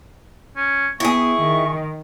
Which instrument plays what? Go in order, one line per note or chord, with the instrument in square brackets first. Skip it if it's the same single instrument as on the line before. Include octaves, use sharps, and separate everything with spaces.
[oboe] C#4
[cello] B3 [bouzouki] E4 G#4 [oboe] C#6
[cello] D#3